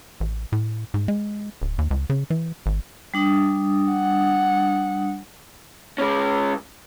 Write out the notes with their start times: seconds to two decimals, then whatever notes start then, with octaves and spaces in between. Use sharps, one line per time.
0.20 A1
0.52 A2
0.94 G#2
1.08 G#3
1.62 D1
1.78 D#2
1.91 C#2
2.10 C#3
2.30 E3
2.66 G#1
3.14 G3 D4 D#6
3.91 F#5
5.98 G#3 C#4